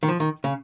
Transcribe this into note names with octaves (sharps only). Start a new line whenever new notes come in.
D#3
F3
D#3
C#3